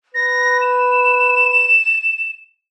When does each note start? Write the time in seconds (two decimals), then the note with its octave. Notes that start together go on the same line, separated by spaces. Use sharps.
0.14 B4 A#6
0.62 E7